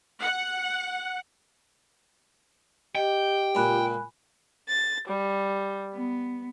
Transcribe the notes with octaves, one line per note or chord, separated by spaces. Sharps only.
F#5
G4 D#5 G5
C#2 A#2 G#5 B5 F#6
A6
G3
B3